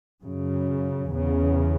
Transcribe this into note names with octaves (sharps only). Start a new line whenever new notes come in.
F#2 C#3
E2 C#3